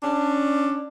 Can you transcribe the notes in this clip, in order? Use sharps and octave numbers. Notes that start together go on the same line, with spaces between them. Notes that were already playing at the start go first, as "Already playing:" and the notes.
C#4 D4